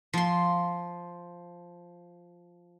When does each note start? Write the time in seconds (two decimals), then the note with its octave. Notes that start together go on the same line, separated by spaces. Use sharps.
0.13 F3 C6